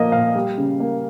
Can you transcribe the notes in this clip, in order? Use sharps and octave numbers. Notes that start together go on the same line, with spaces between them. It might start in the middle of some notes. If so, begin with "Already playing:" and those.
Already playing: A#2 F3 A#3 D#5
A#2 F5
G3
C#3
A#3